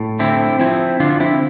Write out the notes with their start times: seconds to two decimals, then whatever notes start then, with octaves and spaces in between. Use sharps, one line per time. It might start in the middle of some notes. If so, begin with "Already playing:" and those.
Already playing: A2
0.19 D3 C4 E4
0.60 F3 C4 E4
1.00 D3 D4 F4
1.20 C4 E4